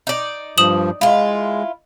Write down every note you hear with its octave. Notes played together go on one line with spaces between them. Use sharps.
D#4 D5
G2 F3 D#6 E7 F#7
G#3 E4 F4 D#5 F5